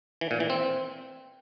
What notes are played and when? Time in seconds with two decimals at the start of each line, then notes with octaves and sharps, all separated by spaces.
0.21 E3
0.31 A#2
0.40 E3
0.50 C4